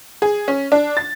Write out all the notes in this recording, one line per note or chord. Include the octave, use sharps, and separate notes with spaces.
G#4
C#4
D4
A6